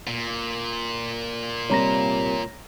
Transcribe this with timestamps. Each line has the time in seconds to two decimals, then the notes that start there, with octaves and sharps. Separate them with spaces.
0.07 A#2
1.70 C3 G3 A#3 C#5 A#5 A#6